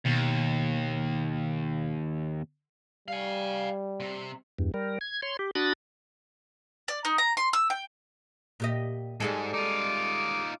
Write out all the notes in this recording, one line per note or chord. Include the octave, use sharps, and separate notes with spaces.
D#2 B2
G3 F5 G#5
C3
E2 G2
G3 A#4
G#6
C#5 C6
G4
D4 F#4 B5 D#6 A6
D5
D#4
A#5
C6
E6
G5
A#2 G4 D#5
G#2 G3 G#3 A4
D#4 F4 D6